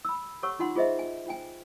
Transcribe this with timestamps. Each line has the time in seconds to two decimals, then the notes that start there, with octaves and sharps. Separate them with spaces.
0.05 B5 E6
0.43 G4 A4 C#5 F#5 C#6 E6
0.59 D#4 F4 F#5 C6
0.76 F4 G#4 C5 D#5 E5
0.99 G#5
1.26 F4 G5 G#5